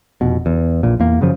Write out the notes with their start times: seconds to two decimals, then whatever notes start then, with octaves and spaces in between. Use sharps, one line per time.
0.21 F1 B2
0.46 E2
0.83 A#1 A#2
1.00 E2 A#3
1.21 F#2 C#3 F3